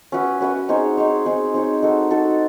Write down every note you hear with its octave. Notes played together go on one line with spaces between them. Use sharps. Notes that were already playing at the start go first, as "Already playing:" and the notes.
C#4 F#4 B4 E5
C#4 F#4 B4 E5
C4 D#4 G#4 C#5
C4 D#4 G#4 C#5
C4 D#4 G#4 C#5
C4 D#4 G#4 C#5
D#4 F#4 A4
D#4 F#4 A4